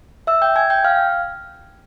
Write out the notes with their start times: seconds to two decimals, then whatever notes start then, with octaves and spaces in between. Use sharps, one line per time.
0.27 E5 E6
0.42 G5 G6
0.56 G#5 G#6
0.70 G5 G6
0.84 F5 F6